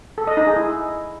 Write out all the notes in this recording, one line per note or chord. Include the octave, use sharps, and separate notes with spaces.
A4
D#5
D#4
G#4
E4